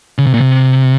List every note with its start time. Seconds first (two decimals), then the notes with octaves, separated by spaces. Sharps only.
0.18 C#3
0.26 C3
0.34 A#2
0.41 C3